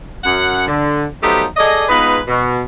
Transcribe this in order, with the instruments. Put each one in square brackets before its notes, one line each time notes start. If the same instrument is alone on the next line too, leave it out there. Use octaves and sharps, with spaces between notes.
[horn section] F#2 F#5
D3
F3 F#3 A3 B3 D#4 G4
G#4 A4 D5 D#5
G#3 B3 D#4 F4 B4
B2